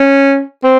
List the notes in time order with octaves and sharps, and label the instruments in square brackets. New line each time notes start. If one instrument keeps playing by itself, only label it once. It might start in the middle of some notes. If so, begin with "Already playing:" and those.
Already playing: [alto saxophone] C#4
C4